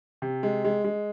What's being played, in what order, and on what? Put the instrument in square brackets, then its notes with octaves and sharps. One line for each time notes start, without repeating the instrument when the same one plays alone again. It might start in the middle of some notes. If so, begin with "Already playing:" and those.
[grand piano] C3
G#3
G#3
G#3